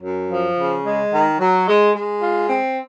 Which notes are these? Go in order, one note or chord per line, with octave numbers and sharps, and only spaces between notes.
F#2
F3
C#3
G#3
D#3
F#3
G#3
G#3
F4
C4